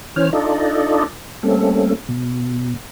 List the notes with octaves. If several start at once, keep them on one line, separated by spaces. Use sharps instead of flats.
E3 C#4 C5 C#5 F6
D4 D#4 F4 A4 D5 D#5
G3 A3 A#3 C4 C#4 A4
B2